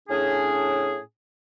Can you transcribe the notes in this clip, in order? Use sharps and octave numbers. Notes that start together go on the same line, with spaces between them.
A2 C#4 D4 G#4